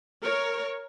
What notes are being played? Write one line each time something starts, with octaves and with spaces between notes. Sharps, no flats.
A#4 C#5